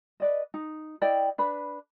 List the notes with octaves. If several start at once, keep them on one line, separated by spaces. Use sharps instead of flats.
B4 D5 D#5
D#4
E4 D5 D#5 G5
D4 B4 B5